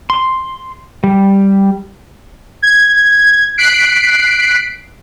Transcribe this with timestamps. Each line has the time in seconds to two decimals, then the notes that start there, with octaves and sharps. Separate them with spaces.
0.10 C6
1.04 G3
2.62 G#6
3.58 F#6 B6 C7 D7